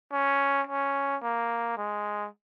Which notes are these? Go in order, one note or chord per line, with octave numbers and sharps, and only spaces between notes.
C#4
C#4
A#3
G#3